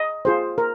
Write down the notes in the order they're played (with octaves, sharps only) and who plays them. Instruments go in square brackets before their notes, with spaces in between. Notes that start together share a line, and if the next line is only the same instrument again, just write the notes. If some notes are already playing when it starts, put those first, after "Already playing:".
Already playing: [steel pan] D#5
F4 G#4 C5
A#4